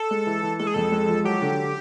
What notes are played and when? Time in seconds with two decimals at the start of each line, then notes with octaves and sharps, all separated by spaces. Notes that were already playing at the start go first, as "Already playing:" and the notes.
Already playing: A4
0.11 G#3
0.26 E3
0.43 E3
0.59 G#3 A4
0.67 G#4
0.74 F2 A4
0.92 G#3
1.09 F3
1.24 F#3 G4
1.42 D3